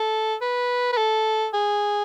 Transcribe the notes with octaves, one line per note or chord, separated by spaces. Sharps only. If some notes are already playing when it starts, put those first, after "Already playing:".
Already playing: A4
B4
B4
A4
G#4